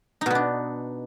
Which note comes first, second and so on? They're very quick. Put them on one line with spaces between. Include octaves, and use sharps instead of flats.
D#4 B2 B3 D4